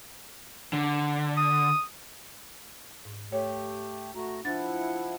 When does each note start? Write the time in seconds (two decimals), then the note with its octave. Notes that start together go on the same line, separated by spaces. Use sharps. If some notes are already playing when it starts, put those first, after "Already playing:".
0.73 D3
1.37 D#6
3.05 G#2
3.32 A3 G4 C#5
4.15 A3 F#4 A#5
4.45 F3 D4 E4 F#5 A6